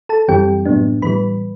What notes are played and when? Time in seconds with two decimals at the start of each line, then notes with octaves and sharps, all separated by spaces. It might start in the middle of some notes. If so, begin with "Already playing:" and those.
0.09 A4 A5
0.28 F#2 E3 G3 C4 G4 G5
0.65 A2 F#3 B3 D4
1.02 A2 E3 G3 B4 B5